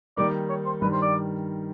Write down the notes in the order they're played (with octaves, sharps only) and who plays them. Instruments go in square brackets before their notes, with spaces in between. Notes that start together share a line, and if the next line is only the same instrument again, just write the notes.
[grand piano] D#3 G3 A#3 D#4 [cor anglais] D5
[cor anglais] C#5
C5
[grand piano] G2 D#3 G3 [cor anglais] B4
[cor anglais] C5
D5